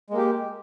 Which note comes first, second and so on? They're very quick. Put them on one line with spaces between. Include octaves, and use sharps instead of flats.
G#3 A#3 G4